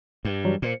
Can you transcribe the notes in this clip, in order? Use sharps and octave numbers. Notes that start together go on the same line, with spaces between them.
G2
E3 F#3 G3
A#2 C5 C#7